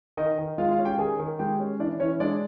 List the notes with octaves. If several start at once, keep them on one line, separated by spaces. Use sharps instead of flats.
D#3 D#4 D#5
D#3
G#3 F4 F5
F4 F5
C#4
G4 G5
D#3 G#4 G#5
D#3
G#3 G4 G5
C#4
E3 D4 D5
E3 C#4 C#5
G#3 D4 D5